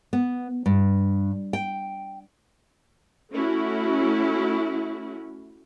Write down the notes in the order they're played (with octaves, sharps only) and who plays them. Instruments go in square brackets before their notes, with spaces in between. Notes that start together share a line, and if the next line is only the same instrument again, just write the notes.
[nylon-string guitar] B3
G2
G5
[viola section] A3 C#4 E4 F#4